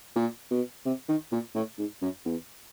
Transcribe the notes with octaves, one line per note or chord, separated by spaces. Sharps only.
A#2
B2
C3
D#3
A#2
A2
G#2
F#2
E2